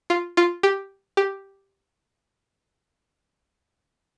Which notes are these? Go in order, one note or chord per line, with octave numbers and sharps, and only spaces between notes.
F4
F4
G4
G4